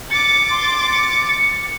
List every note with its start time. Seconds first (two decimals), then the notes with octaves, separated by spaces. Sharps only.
0.11 D6 A6 C#7
0.51 C6
0.92 C#7
1.39 C#7